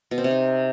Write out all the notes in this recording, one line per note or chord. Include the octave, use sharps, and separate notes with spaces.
B2
C4
C3
D#4